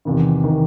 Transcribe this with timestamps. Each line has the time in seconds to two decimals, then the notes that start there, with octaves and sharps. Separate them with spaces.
0.05 E2 C3 D#3
0.44 C3 D#3